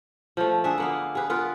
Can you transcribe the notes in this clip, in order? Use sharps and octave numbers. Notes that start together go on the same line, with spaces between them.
F3 A3
D3 G#4 E5
A#3 B3 F5
G#4 B4
B3 F4 A#4 B4